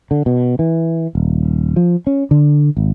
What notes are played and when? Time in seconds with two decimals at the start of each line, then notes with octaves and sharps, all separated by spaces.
0.11 D3
0.26 B2
0.59 E3
1.15 D#1
1.76 F3
2.07 C#4
2.31 D3
2.77 G#1